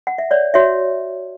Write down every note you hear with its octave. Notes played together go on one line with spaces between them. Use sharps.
F#5
E5
C#5 D5
F#4 C#5 E5